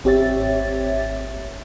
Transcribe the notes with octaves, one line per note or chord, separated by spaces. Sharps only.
G#1 C4 G4 C#5 E5 A6